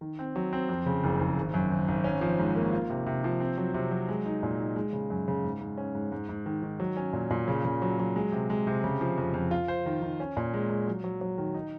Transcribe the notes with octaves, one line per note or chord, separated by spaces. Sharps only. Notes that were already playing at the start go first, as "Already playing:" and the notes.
D#3
C4
F#3
C4
F2
C#3
F#1
F#1
G#1
F#2
G#1
G#1
C#4
F3
G#2
A#3
F4
C3
C3
F3
C4
F#3
C3
F#3
G#3
D#4
A#2
D#4
G#3
C#3
F#2
C#3
G#2
G#2
C#4
G#2
G#2
G#2
D#3
D#3
F#3
C#4
A#2
A#2
C#3
C#3
F#3
F#3
G#3
C3
G#3
C3
C#3
F3
F2
F2
F4
C5
D#3
D#3
C#4
A#2
G#3
G#3
F#3
F#3
F#3
D#3
D#4